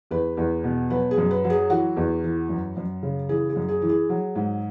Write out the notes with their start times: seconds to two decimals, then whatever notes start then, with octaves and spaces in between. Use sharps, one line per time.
0.11 E2 B4
0.37 E2
0.64 B2
0.90 F#3 B4
1.11 G#4
1.17 F#2
1.31 B4
1.44 F#3
1.50 G#4
1.70 E3 F#4
1.97 E2
2.24 E3
2.49 F#2
2.77 F#2
3.03 C#3
3.29 E3 G#4
3.49 G#4
3.56 F#2
3.68 G#4
3.82 E3
3.89 G#4
4.09 F#3
4.35 G#2